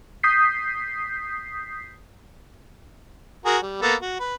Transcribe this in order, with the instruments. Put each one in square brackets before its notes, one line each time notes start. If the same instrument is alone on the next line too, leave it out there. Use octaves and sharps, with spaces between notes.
[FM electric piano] D#6 G6 B6 C7
[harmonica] F#4 G#4 A#4
G3
A#3 B3 A4
F#4
B4